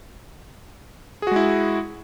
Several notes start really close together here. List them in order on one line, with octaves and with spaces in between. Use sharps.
G#4 F#4 G#3 E4